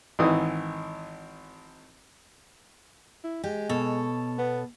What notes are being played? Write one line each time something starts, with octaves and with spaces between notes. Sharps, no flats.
G#1 D#3 E3 D#6
E4
G#3 G4
B2 A4 C#5
B3